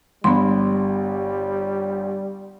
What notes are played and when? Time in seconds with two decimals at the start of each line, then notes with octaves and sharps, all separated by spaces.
0.24 G1 G3 B3 C6